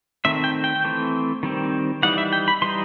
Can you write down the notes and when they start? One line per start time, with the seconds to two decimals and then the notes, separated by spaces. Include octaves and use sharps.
0.25 D#3 A3 C4 E5
0.44 G5
0.64 G5
0.84 E3 A3 C4
1.43 D#3 G3 C4
2.03 E3 G3 D#4 F#5
2.18 E5
2.33 G5
2.48 B5
2.62 E3 G3 D#4 C6